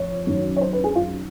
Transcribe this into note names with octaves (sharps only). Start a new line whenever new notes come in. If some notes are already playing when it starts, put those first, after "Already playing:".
Already playing: F2 C#5
F#2 D#3 F#3
C#5
C5
B4
G#4
F4